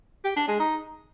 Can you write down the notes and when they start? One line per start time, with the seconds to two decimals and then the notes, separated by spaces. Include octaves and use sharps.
0.24 G4
0.36 D4
0.48 G#3
0.59 D#4